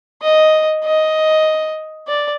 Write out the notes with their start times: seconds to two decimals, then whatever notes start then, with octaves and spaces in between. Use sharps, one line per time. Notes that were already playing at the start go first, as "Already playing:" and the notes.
0.22 D#5
0.84 D#5
2.08 D5